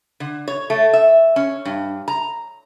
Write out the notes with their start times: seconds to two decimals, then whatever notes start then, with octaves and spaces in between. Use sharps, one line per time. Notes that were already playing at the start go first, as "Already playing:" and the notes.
0.20 D3
0.48 C#5
0.70 A3
0.93 E5
1.36 C#4
1.65 G2
2.08 A#5